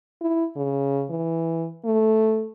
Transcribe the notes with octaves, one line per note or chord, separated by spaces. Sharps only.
E4
C#3
E3
A3